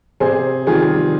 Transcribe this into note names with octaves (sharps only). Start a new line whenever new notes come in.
C3 G#4 C5
D#3 G3 F4 G#4